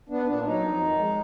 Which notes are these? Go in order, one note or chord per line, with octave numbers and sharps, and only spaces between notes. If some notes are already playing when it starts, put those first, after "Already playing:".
B3 D4
A#2 D4
F#3 D#4
F2
D#3
G#3